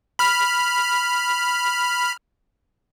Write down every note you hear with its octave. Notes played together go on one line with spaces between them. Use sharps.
B5 F6